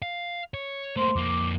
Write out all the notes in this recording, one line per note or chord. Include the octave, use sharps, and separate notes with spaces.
F5
C#5
A3 A#3 C5 C6
F2 A#3 D6